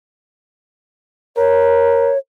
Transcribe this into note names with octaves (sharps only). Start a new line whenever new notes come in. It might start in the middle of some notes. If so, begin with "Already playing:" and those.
A#4 C#5